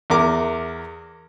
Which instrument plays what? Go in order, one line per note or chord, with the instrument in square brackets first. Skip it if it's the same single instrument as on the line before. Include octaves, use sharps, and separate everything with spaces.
[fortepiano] E2 A#4 D6